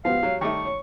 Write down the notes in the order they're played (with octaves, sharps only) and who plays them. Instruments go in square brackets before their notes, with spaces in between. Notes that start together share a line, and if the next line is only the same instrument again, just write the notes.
[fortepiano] F3 [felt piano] B3 G4 [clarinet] F5
[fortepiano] F#3 [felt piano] G4 C#5
[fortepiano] D#3 G3 A3 [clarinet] C#6
[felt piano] C#5